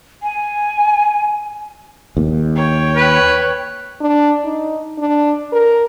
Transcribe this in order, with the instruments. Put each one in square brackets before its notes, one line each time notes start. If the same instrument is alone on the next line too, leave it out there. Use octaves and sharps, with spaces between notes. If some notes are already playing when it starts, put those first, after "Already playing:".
[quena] G#5
[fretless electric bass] D#2
[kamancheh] C#5 G5
[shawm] B4
[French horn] D4
D#4
D4
A#4